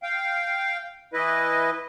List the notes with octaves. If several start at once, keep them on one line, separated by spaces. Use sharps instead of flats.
F5 G5
E3 E4 B4 D#5